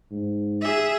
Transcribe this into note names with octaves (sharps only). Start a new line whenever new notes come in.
G#2
G#4 E5